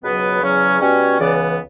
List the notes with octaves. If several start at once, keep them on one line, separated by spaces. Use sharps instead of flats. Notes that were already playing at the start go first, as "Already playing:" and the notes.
C#2 B2 F#3 B3 B4
E2 C#3 F#3 C#4
B2 G3 C#4
C#2 C#3 E3 B3 D5